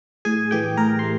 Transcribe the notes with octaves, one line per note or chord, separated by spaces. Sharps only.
A2 G#4 G#5
E3 A3 G4 G5
A2 A#4 A#5
C6
A3